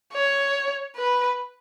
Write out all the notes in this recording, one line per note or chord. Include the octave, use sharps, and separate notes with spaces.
C#5
B4